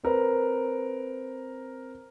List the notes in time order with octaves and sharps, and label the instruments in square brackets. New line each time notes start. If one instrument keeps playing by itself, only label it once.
[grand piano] C4 A#4 B4